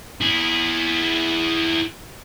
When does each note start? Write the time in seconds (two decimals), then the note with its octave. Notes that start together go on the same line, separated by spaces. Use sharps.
0.21 E4 G#4